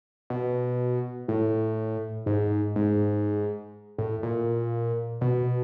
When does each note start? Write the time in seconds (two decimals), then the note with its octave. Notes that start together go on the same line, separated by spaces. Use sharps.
0.30 B2
1.28 A2
2.26 G#2
2.76 G#2
3.98 A2
4.23 A#2
5.21 B2